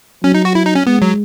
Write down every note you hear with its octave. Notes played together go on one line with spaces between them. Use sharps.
F#3 C#4
D#4
F#4
E4
D#4
C#4
G#3 B3
F#3